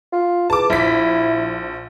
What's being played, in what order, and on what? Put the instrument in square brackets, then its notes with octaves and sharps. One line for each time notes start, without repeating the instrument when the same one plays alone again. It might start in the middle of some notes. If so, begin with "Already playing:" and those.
[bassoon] F4
[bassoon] E2 [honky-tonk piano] A5 D6
[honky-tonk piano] A#1 B6 [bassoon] E4